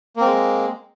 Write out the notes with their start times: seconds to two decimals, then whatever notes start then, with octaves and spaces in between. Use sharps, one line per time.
0.16 A#3
0.21 C4
0.25 G#3